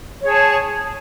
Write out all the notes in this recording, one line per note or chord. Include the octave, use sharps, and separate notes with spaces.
G#4 C#5 A5